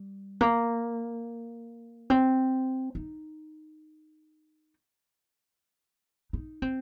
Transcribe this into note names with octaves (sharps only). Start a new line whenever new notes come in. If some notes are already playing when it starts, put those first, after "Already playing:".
Already playing: G3
A#3
C4
D#4
D#4
C4